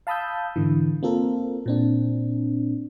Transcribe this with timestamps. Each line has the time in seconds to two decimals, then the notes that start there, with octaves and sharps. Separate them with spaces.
0.07 F5 A5 B5 D#6 E6 G6
0.56 G#2 D3 E3
1.03 A#3 C4 F4 A4 A#4
1.66 A#2 C4 D4